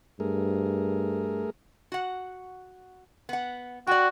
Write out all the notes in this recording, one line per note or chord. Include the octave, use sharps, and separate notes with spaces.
G2 A3 G#4 A#4
F#4 F#5
B3 F#5
F#4 D5 G5